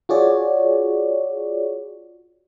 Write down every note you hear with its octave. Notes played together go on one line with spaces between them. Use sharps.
F4 F#4 G#4 C#5 D5